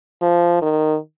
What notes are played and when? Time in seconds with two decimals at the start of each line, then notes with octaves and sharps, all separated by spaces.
0.22 F3
0.62 D#3